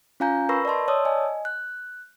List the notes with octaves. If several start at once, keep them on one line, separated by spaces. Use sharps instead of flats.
C#4 F4 F5 G#5 A#5 G6
A#4 B4 B5 C#6 E6 A#6
D5 D#5 A5 C6
C#5 D5 A5 D#6 E6
D#5 G#5
F#6